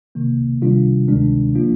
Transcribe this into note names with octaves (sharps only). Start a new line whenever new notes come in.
C3 D#3 A#3
C3 D#3 G3 D4 F4
D2 C3 D#3 G#3 D4
F3 A#3 D4 F4